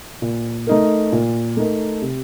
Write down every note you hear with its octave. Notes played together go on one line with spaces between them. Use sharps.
A#2
A3 D#4 A#4
A#2
A3 D#4 A#4
C3